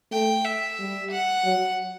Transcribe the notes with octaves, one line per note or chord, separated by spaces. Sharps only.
A3 G5
E5
G3
F#5
F#3